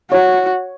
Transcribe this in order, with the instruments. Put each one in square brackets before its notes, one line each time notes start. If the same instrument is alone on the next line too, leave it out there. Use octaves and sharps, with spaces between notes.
[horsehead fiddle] F#4 [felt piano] C#5